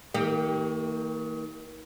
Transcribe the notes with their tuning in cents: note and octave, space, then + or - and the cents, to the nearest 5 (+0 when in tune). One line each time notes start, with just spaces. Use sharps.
D#3 +35 A#3 -30 G4 +0